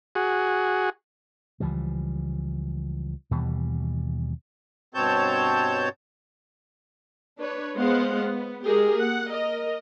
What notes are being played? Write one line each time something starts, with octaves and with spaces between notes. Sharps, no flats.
F#4 G#4
C#2 E3 F3 G3
D#2 B2 E3 G3
G2 B2 C4 C#5 A5 G6
D4 B4 C#5
G#3 B3 C5 F5 F#5
B3
G#3 G4 G#4 A#4
A#3 F#5
A#4 D#5